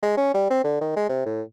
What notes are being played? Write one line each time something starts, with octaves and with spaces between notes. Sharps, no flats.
G#3
C#4
G3
C4
D3
D#3
G#3
C3
A2